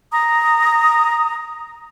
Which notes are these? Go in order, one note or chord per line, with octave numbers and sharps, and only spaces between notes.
A#5 D#6